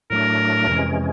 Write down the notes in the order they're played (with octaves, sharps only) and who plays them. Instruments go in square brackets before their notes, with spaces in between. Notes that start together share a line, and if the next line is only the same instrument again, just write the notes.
[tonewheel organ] A2 F#3 A3 D4 [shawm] A#4
[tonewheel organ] F2 C3 E3 G#3 C#4